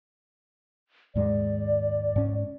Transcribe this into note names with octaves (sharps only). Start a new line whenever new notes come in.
D#2 G#2 G#3 D5
G#2 C#4